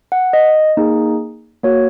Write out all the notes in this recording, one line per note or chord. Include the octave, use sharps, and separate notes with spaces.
F#5
D#5
A#3 D#4 G#4
A#3 F#4 C#5